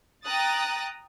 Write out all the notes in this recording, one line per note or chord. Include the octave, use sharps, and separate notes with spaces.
G5 A#5 D#6 F#6 A6